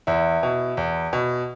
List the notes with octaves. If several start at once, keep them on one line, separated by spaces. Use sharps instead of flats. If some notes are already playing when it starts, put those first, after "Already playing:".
E2 E4
B2
E2
B2